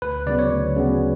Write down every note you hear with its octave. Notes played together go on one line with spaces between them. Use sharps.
D2 B4
C#3 F#3 B3 D5
C#5
D2
C#3 F#3 B3